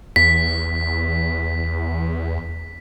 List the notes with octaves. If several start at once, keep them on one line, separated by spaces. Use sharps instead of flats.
E2 B6